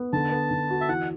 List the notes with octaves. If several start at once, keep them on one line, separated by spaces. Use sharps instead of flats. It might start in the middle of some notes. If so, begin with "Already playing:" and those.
Already playing: B3
D3 A5
B3
D3
F#4
E5
E3 F#5